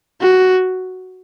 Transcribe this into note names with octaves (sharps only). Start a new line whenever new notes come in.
F#4